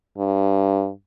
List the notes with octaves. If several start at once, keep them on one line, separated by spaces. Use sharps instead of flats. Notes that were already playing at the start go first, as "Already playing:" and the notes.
G2